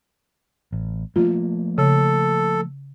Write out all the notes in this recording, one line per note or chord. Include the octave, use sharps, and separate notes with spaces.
A1
F3 A3 A#3 F4
C#3 A4